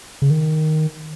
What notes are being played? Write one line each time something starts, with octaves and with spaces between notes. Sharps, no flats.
C#3
D#3